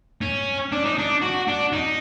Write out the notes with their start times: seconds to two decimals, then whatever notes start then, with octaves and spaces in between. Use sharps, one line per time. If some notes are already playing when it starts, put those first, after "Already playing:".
0.21 C#4
0.72 D4
0.85 D#4
0.98 D4
1.22 F#4
1.48 D4
1.73 D#4